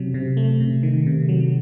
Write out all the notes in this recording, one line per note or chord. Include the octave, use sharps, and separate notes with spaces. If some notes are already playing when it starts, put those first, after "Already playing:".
Already playing: C3 F#3
C3
A3
C3
D#3
C3
F#3